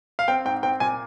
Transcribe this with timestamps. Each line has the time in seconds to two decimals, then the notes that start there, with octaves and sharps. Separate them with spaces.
0.19 F5
0.28 C4 G5
0.45 G#2 G5
0.63 C4 G5
0.80 A#2 G#5